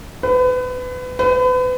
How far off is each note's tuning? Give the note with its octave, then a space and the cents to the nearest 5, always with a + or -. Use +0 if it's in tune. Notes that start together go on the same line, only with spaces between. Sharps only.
B4 +30
B4 +35